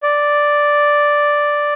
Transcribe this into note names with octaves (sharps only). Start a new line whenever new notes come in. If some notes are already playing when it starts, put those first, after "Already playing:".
D5